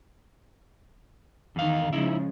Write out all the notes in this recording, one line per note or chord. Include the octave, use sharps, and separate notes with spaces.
E2 D#3 F5
C#3 F3 G#3 D#4 E4